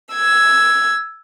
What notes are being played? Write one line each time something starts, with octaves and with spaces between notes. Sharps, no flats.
E6 G#6